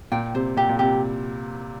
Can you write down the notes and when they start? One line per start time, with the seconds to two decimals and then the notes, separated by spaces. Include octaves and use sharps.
0.12 A#2 G5
0.34 C3 C5
0.57 A#2 G4
0.69 A#2
0.79 C3 G4